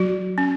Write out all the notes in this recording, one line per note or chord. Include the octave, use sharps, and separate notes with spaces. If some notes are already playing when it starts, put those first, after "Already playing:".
Already playing: F#3 F#4
C#4